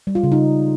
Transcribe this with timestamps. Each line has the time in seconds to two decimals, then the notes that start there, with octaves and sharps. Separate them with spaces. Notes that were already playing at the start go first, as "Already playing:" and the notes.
0.07 G3
0.15 F4
0.23 C#3
0.32 D#4